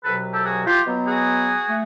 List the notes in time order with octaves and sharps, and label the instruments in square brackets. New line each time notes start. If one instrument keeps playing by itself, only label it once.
[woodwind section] C2 B2 F#3 A4 B4
G4 A4
F#4 G#4
F4 G4
B2 F#3 B3
F#4 G#4
A3